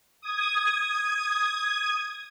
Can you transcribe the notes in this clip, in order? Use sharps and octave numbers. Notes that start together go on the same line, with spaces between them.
D#6 G#6